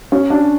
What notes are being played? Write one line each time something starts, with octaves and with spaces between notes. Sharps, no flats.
C#4
D4